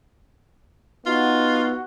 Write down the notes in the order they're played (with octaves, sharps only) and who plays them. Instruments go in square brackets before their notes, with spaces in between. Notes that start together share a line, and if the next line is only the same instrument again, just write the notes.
[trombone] B3 [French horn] D#4 [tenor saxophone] F4 [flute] F#4